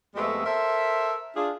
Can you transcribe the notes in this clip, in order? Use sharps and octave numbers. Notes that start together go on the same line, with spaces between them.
F2 G#3 A3 B3 G4 E5
A4 A#4 C5 E5
D4 F4 G#4